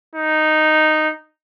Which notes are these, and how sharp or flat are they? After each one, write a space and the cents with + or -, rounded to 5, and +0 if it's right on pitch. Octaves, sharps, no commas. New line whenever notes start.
D#4 -5